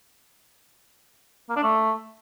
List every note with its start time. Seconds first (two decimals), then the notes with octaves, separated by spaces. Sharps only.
1.49 A#3
1.56 D4
1.63 A3